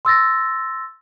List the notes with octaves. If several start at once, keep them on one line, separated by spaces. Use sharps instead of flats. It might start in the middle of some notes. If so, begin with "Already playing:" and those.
C6 E6 A6 A#6